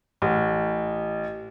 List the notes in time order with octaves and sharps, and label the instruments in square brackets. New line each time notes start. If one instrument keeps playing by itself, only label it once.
[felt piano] A1